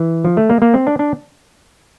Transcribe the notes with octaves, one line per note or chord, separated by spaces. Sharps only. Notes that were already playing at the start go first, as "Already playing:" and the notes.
Already playing: E3
F3
A3
A#3
A#3
C4
D4
D4